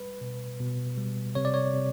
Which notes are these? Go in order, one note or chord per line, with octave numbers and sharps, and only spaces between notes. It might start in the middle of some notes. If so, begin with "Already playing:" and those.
Already playing: G3 B4
B2
B2
G3
C3 C#5
D5
C#5
C3